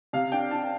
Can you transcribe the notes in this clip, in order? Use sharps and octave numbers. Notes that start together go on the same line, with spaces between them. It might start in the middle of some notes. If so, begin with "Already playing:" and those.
C3 F5
D4 G5
D4 A5
G5